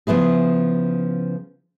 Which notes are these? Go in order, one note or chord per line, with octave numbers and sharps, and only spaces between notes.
C#3 F3 B3 E4 G#4